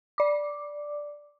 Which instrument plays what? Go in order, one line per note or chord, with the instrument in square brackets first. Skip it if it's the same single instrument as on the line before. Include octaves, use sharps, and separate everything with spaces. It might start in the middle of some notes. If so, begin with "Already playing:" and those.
[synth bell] D5 D6